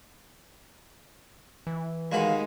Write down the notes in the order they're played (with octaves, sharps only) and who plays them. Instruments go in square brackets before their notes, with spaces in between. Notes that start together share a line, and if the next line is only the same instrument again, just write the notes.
[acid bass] E3
[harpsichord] D#2 F#4 B5 [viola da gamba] G#3 D#4 [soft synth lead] F5